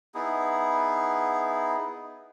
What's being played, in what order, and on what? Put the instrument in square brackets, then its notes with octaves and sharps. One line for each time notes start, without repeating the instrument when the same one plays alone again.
[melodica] B3 D#4 E4 G#4